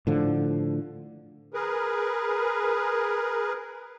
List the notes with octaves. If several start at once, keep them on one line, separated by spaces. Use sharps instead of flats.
A2 D3 F3
G#4 A#4 B4